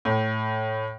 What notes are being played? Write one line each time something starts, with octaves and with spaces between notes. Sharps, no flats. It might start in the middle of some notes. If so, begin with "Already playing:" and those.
A2